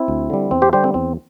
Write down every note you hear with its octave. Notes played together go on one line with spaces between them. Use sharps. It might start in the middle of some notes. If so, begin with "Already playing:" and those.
Already playing: C4 E4
D2
D3 G3
E2 C4
G4 C5
D3 G3 G4 C5
C4
E2 C4